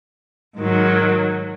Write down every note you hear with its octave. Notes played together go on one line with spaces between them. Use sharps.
G#2 D#3 F#3